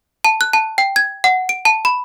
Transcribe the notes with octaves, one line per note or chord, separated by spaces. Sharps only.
A5
F#6
A5
G5
G#6
F#5
D7
A5
B5